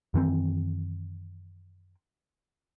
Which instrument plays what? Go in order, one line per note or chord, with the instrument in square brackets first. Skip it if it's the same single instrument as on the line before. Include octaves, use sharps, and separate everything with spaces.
[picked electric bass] F#2 D#3 E3 C4